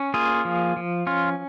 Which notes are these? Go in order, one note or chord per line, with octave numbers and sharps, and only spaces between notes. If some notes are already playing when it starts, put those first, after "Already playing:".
Already playing: C#4
A#3 F4 G#4
F3
F3
C#4 F4